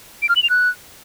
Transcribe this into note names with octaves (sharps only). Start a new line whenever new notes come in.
D7
F6
F#7
F7
F#6